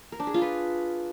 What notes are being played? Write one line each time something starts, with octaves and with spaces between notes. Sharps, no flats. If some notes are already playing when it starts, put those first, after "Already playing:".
A#4
D4
G#4
F4
B4